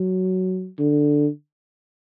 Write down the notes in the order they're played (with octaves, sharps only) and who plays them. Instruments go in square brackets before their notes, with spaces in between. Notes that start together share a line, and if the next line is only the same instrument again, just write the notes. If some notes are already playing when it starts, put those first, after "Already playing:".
Already playing: [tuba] F#3
D3